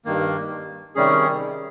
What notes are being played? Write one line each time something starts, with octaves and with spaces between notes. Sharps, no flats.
G2 D#3 A#3
C3 D#3 G3 C#4 G#4